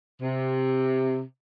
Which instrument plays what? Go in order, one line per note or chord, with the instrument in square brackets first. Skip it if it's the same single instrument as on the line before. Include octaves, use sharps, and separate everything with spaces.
[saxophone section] C3